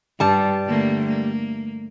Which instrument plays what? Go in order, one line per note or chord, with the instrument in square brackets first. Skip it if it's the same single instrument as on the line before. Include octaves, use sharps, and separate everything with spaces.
[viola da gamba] G2 [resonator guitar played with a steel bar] G3 A5
[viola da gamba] D3 A3 A#3
A#3